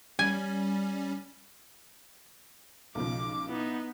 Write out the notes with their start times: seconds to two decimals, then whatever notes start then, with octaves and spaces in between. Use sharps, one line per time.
0.19 G3 C#4 G#5
2.95 B1 C#3 F3 D6
3.49 B3 D#4 E4